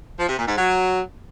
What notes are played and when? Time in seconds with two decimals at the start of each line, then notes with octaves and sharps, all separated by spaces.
0.18 F3
0.28 C3
0.37 A#2
0.47 G#2
0.56 F#3